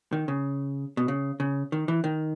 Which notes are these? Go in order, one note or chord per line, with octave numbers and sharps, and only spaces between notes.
D#3
C#3
B2
C#3
C#3
D#3
E3
D#3